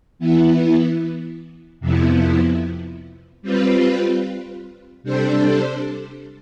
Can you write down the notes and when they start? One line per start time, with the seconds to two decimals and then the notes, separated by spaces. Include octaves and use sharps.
0.19 E3 B3 E4
1.80 F2 C3 F3 B3 E4
3.42 G3 C4 F4 B4
5.03 C3 G3 D4 A4 C5